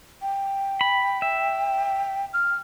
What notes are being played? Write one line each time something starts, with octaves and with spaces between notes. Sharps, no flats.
G5
B5
E5
F6